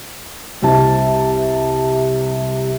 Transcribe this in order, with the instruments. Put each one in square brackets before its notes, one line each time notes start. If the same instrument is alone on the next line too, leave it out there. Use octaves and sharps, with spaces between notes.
[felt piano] C2 C3 A5